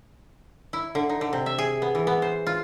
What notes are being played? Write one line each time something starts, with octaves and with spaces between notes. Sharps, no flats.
E4
D3
D#4
D3
C3
E5
G#4
B3
E3
B3
C5
F4